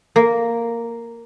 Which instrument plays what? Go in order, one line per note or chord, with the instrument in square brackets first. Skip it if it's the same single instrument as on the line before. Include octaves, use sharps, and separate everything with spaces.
[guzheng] A#3